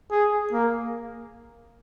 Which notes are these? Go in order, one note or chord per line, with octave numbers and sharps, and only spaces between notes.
G#4
A#3